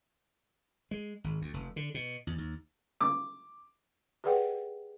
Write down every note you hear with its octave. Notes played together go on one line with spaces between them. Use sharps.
G#3
G#1
D2
F1
D3
B2
E2
D#2
D6
G4 G#4 B4 D5 F#5 G5